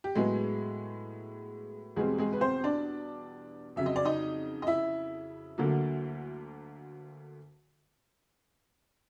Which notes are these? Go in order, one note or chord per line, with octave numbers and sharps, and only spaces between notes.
G4
A2 F#3 G#3 B3 G#4
E2 B2 G3 G#3 C4 G#4
G#3 G#4
B4
C4 C5
D4 D5
F2 C#3 F#3 E5
D#5
D5
D#4 D#5
D#5
E4 E5
D2 D3 F#3 A#3